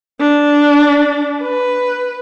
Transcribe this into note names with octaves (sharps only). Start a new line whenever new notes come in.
D4
B4